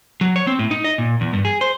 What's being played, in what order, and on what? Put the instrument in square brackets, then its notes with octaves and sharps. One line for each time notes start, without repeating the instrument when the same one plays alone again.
[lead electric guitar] F#3
C#5
C4
A2
D#4
D#5
A#2
E2
G2
G#4
C5